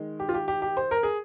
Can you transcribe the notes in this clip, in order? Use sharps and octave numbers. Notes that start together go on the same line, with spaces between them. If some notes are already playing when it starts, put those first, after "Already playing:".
Already playing: D#3 G#3
G4
F4
G4
G4
G4
C5
A#4
G#4